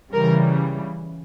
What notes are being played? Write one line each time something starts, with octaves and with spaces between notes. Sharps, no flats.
C#3 E3 G3 A#4